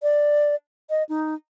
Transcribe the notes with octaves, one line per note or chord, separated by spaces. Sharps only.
D5
D#5
D#4